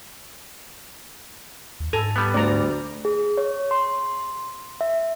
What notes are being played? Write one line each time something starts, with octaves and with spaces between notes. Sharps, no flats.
D#2
G#2 A4 G#5 A#5
G3 B3
D2 D5 A#5
G#4
C#5
C6
E5